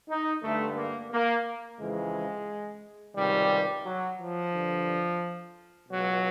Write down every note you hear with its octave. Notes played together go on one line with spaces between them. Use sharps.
D#4
G2 D3 A3
A#3
A#3
F2 C#3 E3 G#3
C#2 C3 D#3 G3
F#3
F3
G2 D3
C#2 B2 F#3